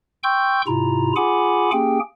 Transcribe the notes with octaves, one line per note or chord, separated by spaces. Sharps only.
G5 C6 C#6 E6 G6
G#2 C3 E4 F4 A#5
F4 G#4 F#5 G#5 B5 D6
A#3 C#4 G4 G#4 G5